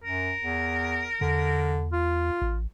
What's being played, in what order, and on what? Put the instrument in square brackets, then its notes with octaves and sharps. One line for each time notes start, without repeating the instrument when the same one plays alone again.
[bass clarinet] F#2 [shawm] A#4
[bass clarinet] E2
[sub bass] E2 [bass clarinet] D3
[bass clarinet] F4
[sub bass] A1